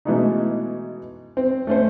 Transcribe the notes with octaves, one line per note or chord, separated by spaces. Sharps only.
B2 E3 G#3 A3 D#4
C4
A3 C#4 C5